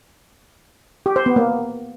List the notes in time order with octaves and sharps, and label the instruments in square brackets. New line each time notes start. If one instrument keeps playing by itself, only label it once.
[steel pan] G4
C5
B3
A#3